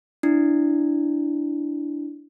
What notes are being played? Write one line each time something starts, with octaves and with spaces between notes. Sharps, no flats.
D4 E4